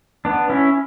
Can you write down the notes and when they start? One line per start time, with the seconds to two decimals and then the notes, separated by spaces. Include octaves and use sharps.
0.25 B3 D4
0.50 C#4 E4